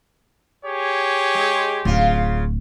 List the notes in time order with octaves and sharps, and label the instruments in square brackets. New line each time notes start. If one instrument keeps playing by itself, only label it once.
[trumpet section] G4 G#4 C#5
[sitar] G#3
[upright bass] D1 [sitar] C#3 F4